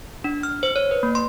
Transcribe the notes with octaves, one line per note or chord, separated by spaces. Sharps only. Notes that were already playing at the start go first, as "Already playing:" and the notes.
D4
F6
C5
C#5
B4
A#3
C6